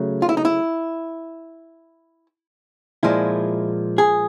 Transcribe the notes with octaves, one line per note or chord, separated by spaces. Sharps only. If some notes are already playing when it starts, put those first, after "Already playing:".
Already playing: C#3 F#3 A3
F4
E4
D#4
E4
A#2 F3 G#3 E4
G#4